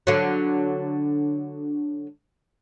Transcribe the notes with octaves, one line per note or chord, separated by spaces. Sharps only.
D3 F#3